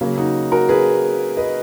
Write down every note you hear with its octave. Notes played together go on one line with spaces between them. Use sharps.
C#3 F#3 A#3
D#4 F#4
F#4 A#4
G#4 B4
B4 D#5